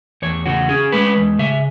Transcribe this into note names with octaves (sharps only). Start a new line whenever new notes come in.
E2 C#5
C#3 F#4
C#4 G#4
G#3 B4
E2
C#3 E5